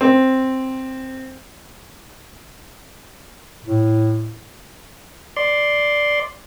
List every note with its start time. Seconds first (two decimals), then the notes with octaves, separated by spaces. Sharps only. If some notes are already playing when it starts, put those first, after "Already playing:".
0.01 C4
3.64 A2
5.36 D5 C6